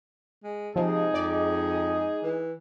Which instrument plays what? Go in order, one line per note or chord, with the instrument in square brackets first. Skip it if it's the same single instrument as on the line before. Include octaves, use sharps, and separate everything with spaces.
[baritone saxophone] G#3
[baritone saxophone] C3 [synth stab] F3 [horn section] G#3 D#4 G#4
[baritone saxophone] F2 [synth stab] D5
[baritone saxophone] E3